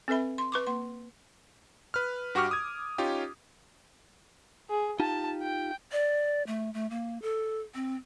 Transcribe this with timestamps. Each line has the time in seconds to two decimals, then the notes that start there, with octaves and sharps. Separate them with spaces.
0.08 C4 A4 B4 E5 B5
0.38 C6
0.52 B4 C#6 D6
0.67 A#3 C6
1.94 B4 F6
2.35 G2 F#4 G4 C#6 D6 F6
2.51 D#6 G#6
2.98 C#4 D#4 F4 G4
4.70 G#4
5.00 D#4 F4 G4 A5
5.42 G5
5.92 D5
6.47 A3
6.74 A3
6.90 A#3
7.22 A4
7.75 C4